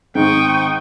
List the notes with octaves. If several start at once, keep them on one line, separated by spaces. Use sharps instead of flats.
G#2 D#3 C4 G5 C#6 D#6